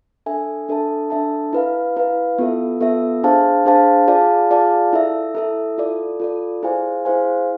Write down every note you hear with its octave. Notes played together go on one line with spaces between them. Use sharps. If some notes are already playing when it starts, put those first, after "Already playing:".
D4 A4 E5 G#5
D4 A4 E5 A5
D4 A4 E5 A5
E4 B4 F5
E4 B4 F5
B3 F4 A4 E5
B3 F4 A4 E5
D4 G#4 C5 F5 A5
D4 G#4 C5 F5 A5
F4 G#4 D5 F5 A5
F4 G#4 D5 F5 A5
E4 A4 E5
E4 A4 E5
F4 A4 D5
F4 A4 D5
E4 G#4 C5 F5 G#5
E4 G#4 C5 F5 G#5